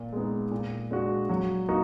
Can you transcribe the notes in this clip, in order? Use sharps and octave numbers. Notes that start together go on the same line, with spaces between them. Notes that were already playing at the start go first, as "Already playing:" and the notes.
Already playing: A#2
G#3 B3 D#4
A#2
G#3 D4 F#4
F#3
A#3 D#4 F#4